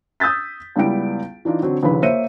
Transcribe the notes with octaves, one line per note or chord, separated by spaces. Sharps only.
D#6 E6 G6 A6 B6
C#2 G3 B3 E4 G5 D7
E3 D4 D#4 F4
D3 F#3 C4
A#1 D#2 C#3 E4 B4 B5
A#3 C5 C#5 E5 C#7 D#7